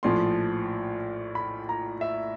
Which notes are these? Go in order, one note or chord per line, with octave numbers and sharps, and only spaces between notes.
A#1 A2 F3 C6
B5
A#5
E5